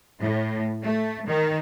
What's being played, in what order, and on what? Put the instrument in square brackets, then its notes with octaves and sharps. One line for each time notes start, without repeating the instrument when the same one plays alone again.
[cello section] A2
A3
D#3